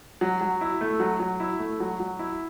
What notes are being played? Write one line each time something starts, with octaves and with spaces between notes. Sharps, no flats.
F#3
F#3
E4
A3
F#3
F#3
E4
A3
F#3
F#3
E4